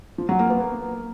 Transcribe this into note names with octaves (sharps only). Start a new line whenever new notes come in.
F3
F#3
A#3
B3
A#3